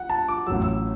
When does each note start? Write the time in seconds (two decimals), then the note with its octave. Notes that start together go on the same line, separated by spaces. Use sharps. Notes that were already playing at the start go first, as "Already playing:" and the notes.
Already playing: F#5
0.10 A5
0.28 D6
0.47 A1 A2 F#3 E6
0.62 E6